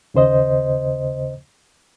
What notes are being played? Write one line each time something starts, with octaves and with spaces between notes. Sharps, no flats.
D#2 C#3 C5 D#5